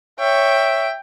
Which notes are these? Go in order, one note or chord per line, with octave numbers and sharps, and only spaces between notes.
C#5 E5 G5